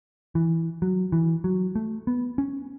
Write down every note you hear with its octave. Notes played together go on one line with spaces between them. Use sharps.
E3
F#3
E3
F#3
A3
B3
C#4